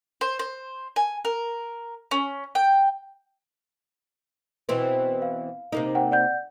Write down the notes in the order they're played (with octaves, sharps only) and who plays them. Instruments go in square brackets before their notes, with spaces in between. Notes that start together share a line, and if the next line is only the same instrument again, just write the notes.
[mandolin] C5
C5
G#5
A#4
C#4
G5
[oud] B2 E3 C4
[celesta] F5
[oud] C3 A#3 D#4
[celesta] C5 F#5 G5
D5 F#5 G6